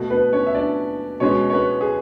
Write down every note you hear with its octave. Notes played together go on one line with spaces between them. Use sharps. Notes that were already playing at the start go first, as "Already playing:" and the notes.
Already playing: B2 A3
B3 B4
C#4 C#5
E5
D4 D5
B2 G#3 B3 C#4 C#5
C#5
B3 B4
G#4